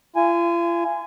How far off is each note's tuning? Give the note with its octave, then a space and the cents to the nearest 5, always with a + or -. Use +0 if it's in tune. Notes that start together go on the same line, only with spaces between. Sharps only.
F4 -40 G#5 +0